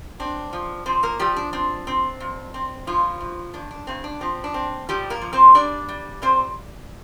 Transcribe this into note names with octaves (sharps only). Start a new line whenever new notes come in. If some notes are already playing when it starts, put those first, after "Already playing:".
C4 D4
F3
F3 C4 C5
A#3 A#4
F3 G3 G4
D4
C4 D4
C4
F2
C4
G2 F3 F4
G2
G2 D4
D4
G2 C4
D4
F3 C4
D4
C4
F3 G3 G4
A#3 A#4
F3
C4 C5
G3 D4 D5
G3
A#2 C4 C5